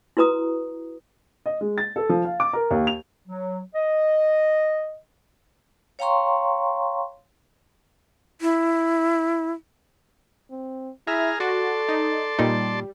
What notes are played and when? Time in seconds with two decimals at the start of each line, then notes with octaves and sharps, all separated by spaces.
0.17 E4 F#4 B4 A#5 D#6
1.46 D#5
1.61 G#3
1.78 A6
1.96 A4
2.09 F3
2.25 F5
2.40 D6
2.53 A#4
2.71 D#2
2.87 F7
3.28 F#3
3.75 D#5
5.99 C#5 F5 G5 A#5 C6 C#6
8.41 E4
10.51 C4
11.07 E4 G#4 E5 A#5 F6
11.40 F#4 A4 D5 A5 C6
11.89 D#4
12.39 A#2 G3 D#4